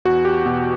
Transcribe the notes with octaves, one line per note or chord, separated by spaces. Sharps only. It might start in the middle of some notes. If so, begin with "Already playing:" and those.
E2 F#4
G4
B2